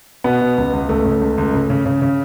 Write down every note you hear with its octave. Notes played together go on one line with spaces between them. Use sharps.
B2 B3
B2
C#2
C#2
C#2 A3
C#3
C#2
C#2
C#3
C#3
C#3
C#3